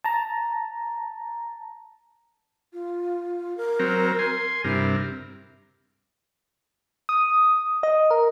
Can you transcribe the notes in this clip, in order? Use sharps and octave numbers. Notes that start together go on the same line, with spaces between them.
A5 A#5
F4
A#4
F#3 C4 A#5
G#5 C6
G2 C3 E4 A#4
D#6
D#5
A#4